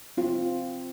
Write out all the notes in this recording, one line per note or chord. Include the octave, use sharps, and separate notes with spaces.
C4 F4